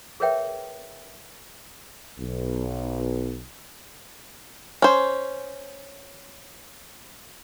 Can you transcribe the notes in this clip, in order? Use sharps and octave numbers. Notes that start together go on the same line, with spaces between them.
G#4 A#4 B4 C#5 E5 G5
B1
C#4 C5